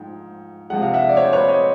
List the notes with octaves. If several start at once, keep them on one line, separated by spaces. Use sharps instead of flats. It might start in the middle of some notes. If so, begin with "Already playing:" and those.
Already playing: G#2 F3 G5
C3 F3 G#3 F#5
F5
E5 F#5
D5
C#5
C5
B4 C#5
C#5 D#5